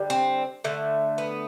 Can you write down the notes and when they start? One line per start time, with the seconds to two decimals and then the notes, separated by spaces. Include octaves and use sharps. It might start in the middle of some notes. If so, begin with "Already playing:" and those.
Already playing: D3 G3
0.10 C4
0.64 D3 A3
1.18 B3